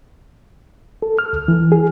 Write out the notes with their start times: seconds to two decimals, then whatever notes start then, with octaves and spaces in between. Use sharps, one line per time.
1.02 A4
1.19 F6
1.33 D2
1.48 E3
1.72 G#4